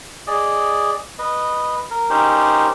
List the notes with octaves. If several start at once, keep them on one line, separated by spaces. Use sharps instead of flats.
G#4 D5 D#5
B4 D#5
A#4
C#4 D#4 G4 A#4 C5